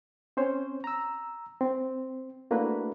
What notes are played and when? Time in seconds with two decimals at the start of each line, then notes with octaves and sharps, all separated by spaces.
0.37 C4 C#4 C5 C#5
0.84 A#5 E6
1.61 C4
2.51 A3 A#3 D4 E4 F#4 B4